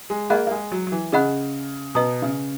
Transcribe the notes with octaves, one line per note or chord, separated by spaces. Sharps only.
G#3
A#3 G#4 D#5 F#5 B5 F#6
A#3
G#3
F#3
F#3
E3
C#3 G#4 D#5 F#5 B5 F#6
B2 B4 D#5 A#5 D#6
C#3